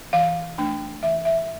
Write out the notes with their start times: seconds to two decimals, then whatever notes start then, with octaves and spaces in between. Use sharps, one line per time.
0.13 E3 F5
0.58 A3 D4
1.03 E3 E5
1.25 E5